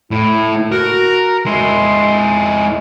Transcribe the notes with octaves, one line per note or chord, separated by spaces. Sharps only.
A2 E4
F#4 A#4
G#3 E4 C6